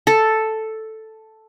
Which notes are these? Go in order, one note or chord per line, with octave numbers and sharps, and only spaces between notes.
A4